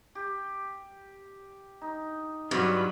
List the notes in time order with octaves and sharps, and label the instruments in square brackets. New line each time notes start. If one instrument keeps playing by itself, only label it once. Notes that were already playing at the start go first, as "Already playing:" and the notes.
[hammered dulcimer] G4
D#4
[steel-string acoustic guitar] G2 [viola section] F#3 F4 B5